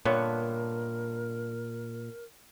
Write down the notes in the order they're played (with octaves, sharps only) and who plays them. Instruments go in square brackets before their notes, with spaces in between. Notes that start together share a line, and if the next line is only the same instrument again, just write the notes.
[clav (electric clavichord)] G2 D3 B3 [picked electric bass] A#2 [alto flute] A#4 [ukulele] C#5